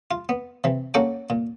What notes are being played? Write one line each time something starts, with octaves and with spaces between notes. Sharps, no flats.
F4
B3
C3 E3
A#3 C#4 F#4 A4 F#5 G5
A#2